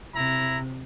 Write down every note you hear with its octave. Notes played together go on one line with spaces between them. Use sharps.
C3 E4 A#5